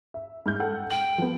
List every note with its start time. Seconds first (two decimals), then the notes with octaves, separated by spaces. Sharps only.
0.14 E5
0.46 G#2 F6 G6
0.60 A4 F#5 G5
0.90 G5 F#7
1.18 F3 B3